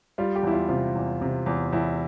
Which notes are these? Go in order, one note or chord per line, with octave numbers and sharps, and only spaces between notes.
G3 F4
G4
E2 E4
F4
C3 F4
E2
C3
E2
E2 E4